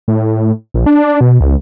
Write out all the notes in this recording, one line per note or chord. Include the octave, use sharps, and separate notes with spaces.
A2
A#1
D4
B2
C#2